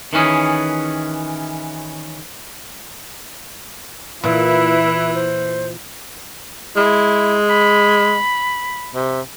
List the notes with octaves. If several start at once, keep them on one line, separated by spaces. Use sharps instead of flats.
D#3 E3 C#4 G#4
A#2 E3 E4 B4
C5
G#3 E4
B5
C3